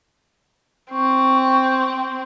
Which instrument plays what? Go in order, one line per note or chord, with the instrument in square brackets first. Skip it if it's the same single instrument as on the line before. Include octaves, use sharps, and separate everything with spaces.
[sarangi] C4 [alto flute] C#6